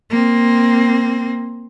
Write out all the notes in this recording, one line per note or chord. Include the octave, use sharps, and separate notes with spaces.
A#3 C4